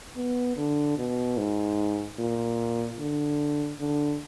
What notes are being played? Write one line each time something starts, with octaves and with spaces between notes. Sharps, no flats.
B3
D3
B2
G#2
A#2
D3
D3